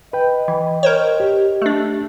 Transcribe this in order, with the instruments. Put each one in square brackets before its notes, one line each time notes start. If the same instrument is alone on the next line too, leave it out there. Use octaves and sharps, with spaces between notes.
[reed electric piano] B4 G5 [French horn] D#5
[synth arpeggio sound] E3
A#4 C5 C#5
[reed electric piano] G4
[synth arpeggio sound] A3 D4